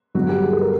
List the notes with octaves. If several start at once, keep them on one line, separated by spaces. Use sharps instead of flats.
G2 D3 F#3 B3 F#4
G4
G#4
A4
A#4